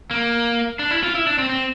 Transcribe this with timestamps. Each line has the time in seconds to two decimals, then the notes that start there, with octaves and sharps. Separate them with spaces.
0.11 A#3
0.79 D4
0.91 E4
1.03 F4
1.15 E4
1.27 D4
1.38 C4
1.49 C4